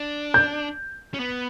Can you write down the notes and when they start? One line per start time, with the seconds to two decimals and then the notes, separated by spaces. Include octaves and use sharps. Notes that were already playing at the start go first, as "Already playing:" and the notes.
Already playing: D4
0.34 G6
1.14 C#4
1.19 B3